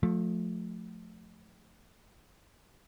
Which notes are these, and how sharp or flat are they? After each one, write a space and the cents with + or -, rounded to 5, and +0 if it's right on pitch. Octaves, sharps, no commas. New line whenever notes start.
F3 +30 A3 +0